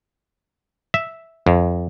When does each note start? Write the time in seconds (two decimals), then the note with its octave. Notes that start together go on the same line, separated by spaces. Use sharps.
0.94 E5
1.47 F2